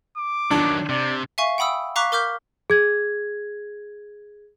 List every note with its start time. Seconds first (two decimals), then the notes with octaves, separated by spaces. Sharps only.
0.18 D6
0.51 D#3 F#3 D4
0.89 C3 D5
1.38 E5 F5 G#5 C#6
1.58 F#5 G5 B5 D#6 E6
1.96 F5 A#5 C#6 D6 F#6 B6
2.12 A#4 D6 F6 G6 B6
2.70 G#4 G#6